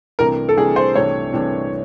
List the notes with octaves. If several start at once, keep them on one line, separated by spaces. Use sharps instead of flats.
C2 C3 E3 A3 D4 A#4
A4
C2 C3 E3 A3 D4 G#4
C5
C2 C3 E3 A3 D4 C#5
C2 C3 E3 A3 D4